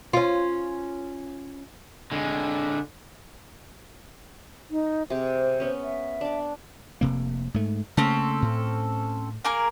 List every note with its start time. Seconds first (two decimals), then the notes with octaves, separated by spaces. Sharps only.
0.13 C#4 F4
2.12 D3 G#3
4.71 D#4
5.10 C3 G#4 C5 D6
5.60 B3 C#4
5.83 E5
6.21 D4 D6
7.01 F1 C3 A#3
7.54 G#2 A3
7.97 C#3 A3 A#3 C4 C#4 A4
8.42 A2
9.45 A#3 G#4 A#4